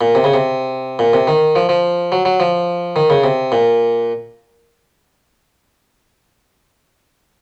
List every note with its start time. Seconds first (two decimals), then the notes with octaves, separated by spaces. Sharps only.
0.01 A#2
0.15 C3
0.24 C#3
0.34 C3
0.99 A#2
1.13 C3
1.27 D#3
1.56 F3
1.69 F3
2.12 F#3
2.25 F#3
2.40 F3
2.96 D#3
3.10 C#3
3.24 C3
3.52 A#2